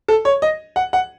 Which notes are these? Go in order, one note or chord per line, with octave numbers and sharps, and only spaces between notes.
A4
C#5
D#5
F#5
F#5